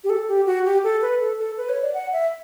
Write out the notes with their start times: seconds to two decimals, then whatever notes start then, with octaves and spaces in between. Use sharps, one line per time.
0.04 G4
0.10 A4
0.28 G4
0.46 F#4
0.65 G4
0.84 A4
1.02 B4
1.20 A4
1.39 A4
1.57 B4
1.69 C#5
1.82 D5
1.94 F#5
2.13 E5